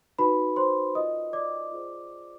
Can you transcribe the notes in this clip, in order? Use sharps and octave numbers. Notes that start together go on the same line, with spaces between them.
D#4 F#4 B4 B5
C5 C6
F4 A#4 D5 D#5 D#6
D5 D6
F4 G#4 C5